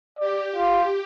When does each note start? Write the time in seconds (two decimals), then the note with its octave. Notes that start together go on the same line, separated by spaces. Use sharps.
0.19 G4 D5
0.56 F4